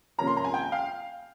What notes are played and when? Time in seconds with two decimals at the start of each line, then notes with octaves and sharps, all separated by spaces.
0.18 C3 F3 A#3 C#4 A#5
0.27 C6
0.37 A#5
0.44 G#5
0.54 G5
0.72 F5